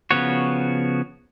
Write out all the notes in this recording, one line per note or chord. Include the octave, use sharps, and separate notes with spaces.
C#3 F3 B3 F#4 C#5